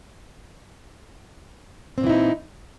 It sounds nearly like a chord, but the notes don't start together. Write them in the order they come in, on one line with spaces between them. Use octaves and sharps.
C4 A#2 E3 E4 D#4